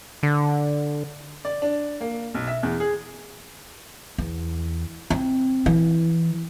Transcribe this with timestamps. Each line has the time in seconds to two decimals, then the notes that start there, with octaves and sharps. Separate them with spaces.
0.23 D3
1.45 D5
1.62 D4
2.01 A#3
2.35 B1
2.48 E5
2.63 E2
2.80 G#4
4.18 E2
5.10 C4
5.66 E3